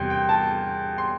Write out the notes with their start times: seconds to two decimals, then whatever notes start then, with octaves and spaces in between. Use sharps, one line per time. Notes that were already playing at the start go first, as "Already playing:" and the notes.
Already playing: E2 C3 G3 G5 C6
0.10 G5
0.29 A5
0.98 C6